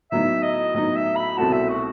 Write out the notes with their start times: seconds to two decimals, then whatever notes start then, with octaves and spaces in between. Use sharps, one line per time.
0.11 A2 F#3 B3 D#4 E5
0.43 D#5
0.74 A2 F#3 B3 D#4 D#5
0.96 E5
1.16 B5
1.37 C2 B2 A3 C4 F#4 A5
1.53 E5
1.69 F#4